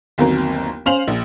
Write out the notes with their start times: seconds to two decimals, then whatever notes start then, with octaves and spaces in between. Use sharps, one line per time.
0.18 G1 D#2 F#3 A#3 C4 A#4
0.86 C#4 C5 F5 F7 F#7
1.08 A#1